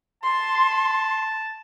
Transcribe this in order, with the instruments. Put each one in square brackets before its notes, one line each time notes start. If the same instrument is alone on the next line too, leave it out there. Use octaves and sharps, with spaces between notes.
[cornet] A5 [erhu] C6